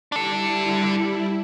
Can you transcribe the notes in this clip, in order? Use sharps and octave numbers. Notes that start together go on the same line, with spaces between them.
G3 D4 E4 A4